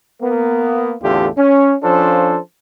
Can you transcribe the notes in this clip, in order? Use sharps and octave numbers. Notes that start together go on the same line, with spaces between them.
A#3 B3
A1 E2 D3 A3 F4 G4
C#4
F3 C#4 D4 F4 A4 C5